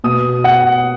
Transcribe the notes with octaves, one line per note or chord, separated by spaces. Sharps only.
B2 D#6
F#5